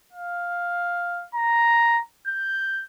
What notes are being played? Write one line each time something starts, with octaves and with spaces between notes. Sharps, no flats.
F5
A#5
G6